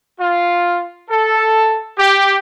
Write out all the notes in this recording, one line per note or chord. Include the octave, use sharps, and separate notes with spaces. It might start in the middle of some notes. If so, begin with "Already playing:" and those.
F4
A4
G4